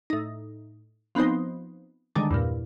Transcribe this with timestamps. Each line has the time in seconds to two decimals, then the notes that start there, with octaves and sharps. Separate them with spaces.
0.10 A2 D#4
1.15 F3 B3 C4 D#4 C5
2.15 D3 D#3 G3 G#3 D4
2.31 E2 G2 A#2